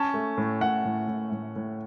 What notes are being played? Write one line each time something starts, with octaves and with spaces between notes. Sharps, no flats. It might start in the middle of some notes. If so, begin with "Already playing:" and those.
Already playing: C#4 A5
A3
A2
A2 F#5
A2
A2
A2
A2